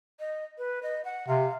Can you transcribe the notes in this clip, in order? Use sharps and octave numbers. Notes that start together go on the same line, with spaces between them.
D#5
B4
D#5
F#5
C3 F5